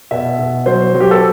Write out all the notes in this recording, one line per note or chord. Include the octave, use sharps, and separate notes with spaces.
B2 E5
B2
F#3 C5
F#3
G4
A4